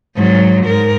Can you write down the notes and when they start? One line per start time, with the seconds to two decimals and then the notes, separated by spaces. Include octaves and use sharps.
0.16 G#2 F#3
0.65 G#2 A#4